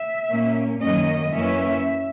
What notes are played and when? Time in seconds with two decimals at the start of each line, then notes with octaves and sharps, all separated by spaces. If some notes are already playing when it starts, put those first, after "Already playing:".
Already playing: E5
0.29 A#2 A#3 C#4
0.81 F#2 D#3 F#3 A#3 C#4 D#5
1.32 F#2 E3 A#3 C#4 E5